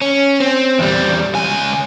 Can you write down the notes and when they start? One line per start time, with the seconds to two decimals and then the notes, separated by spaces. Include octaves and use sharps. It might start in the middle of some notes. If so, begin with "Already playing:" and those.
0.02 C#4
0.40 C4
0.79 E2 G3
1.35 C#2 G#5